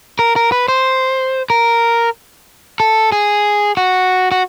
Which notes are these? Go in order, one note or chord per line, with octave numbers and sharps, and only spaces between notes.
A#4
A#4
B4
C5
A#4
A4
G#4
F#4
F#4